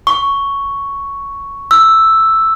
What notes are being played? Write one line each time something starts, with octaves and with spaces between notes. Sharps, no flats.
C#6
E6